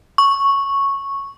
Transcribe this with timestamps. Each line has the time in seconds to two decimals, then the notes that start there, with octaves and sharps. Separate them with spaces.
0.18 C#6